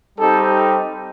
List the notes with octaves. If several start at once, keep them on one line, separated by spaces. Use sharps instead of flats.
G3 C4 D#4 G4 A4